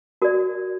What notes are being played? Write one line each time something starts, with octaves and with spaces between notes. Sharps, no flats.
F#4 A#4 D5